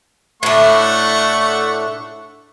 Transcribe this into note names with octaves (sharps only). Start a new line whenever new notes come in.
A2 A3 D4 F#5 C#6